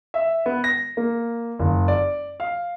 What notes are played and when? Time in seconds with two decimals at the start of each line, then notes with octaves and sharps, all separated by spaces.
0.14 E5
0.46 B3
0.64 A#6
0.97 A#3
1.59 F#1
1.88 D5
2.40 F5